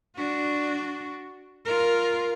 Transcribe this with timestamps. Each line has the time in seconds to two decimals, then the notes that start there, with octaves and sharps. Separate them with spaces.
0.17 D4 F#4
1.65 F4 A#4